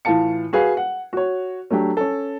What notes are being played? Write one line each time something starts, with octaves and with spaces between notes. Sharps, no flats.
A2 E3 F4 A5 C#7
F#4 G#4 B4 F5
F#5
F#4 C#5
F#3 A3 D4 G4
C#4 A4